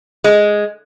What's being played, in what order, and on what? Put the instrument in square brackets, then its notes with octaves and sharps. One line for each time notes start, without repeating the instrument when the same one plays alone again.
[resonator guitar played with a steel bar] G#3